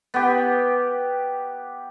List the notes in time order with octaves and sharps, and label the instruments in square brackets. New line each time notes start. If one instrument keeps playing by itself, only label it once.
[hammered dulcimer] B3 G4